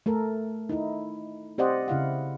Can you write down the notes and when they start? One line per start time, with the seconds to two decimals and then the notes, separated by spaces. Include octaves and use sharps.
0.06 A3 A4 A#4
0.69 D#4 E4
1.58 C4 G4 C5 D5 D#5 F#5
1.88 C#3 E4 F5 F#5